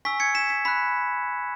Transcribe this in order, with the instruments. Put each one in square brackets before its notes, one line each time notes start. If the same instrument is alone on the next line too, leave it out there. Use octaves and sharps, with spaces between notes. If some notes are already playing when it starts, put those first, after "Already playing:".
[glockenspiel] G#5 C#6 E6 B6
G#6 C#7
B6 E7
B6
B5 F#6 B6